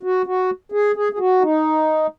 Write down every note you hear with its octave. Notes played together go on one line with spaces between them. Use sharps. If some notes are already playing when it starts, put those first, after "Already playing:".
F#4
F#4
G#4
G#4
G#4
F#4
D#4